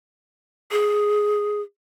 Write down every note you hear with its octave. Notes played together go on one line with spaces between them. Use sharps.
G#4